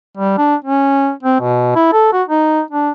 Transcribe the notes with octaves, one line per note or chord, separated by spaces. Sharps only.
G3
D4
C#4
C4
B2
E4
A4
F#4
D#4
D4